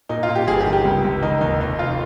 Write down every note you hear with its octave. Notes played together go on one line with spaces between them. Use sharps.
A#2 D#4
F4
A#2
G4
G1 G#4
G4
D#3
G4
C#2
C#2
D#3 D#4
D#2 D#4
F1 D#4
F1 F4